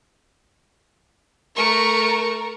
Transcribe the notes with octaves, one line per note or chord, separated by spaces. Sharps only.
A3 A#4 C#6